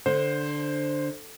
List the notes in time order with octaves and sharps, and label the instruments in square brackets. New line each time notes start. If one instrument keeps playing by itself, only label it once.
[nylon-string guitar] D3 [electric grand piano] C5